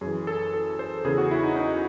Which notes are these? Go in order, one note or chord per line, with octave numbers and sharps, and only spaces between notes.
F#2 G#4
E3
A4
A4
C5
E2 C#3 E3 G#4
F#4
E4
D#4
D#4